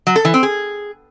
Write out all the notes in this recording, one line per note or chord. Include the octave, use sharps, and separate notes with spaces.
F#3
A4
E3
C4
G#4